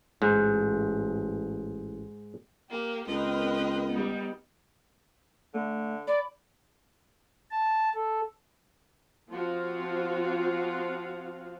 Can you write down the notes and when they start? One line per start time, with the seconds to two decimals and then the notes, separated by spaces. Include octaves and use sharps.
0.22 A1 G#2
2.70 A#3 G4
3.08 C#2 C4 A#4 B4 D#5 G5
3.90 G3 B3 D#4
5.54 D3 A3
6.07 D5 B5
7.51 A5
7.94 A4
9.29 F3 C4 F4 F#4 F5